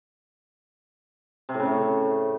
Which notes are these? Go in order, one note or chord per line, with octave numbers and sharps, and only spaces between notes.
C3
A2
C#3
A3